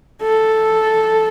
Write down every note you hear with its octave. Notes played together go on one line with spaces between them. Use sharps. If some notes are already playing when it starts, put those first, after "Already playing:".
A4